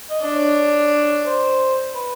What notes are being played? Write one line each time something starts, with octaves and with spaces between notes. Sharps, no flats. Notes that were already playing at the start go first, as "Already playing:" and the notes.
D#5
D4
C#5
C5
B4